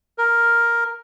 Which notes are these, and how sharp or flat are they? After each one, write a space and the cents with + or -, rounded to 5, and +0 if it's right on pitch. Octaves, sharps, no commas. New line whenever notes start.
A#4 +5